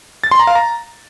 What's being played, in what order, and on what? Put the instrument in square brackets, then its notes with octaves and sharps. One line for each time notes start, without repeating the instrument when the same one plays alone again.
[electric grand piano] A6
C6
A#5
F5
A#5